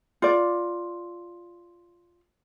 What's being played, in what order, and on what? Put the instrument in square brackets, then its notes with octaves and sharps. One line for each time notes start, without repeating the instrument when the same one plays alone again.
[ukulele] F4 D5